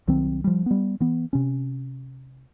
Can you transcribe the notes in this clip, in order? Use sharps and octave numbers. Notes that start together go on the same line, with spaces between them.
C2 D#3 F#3 C4
F3 G3
G3 B3
E3 B3
C3 C#4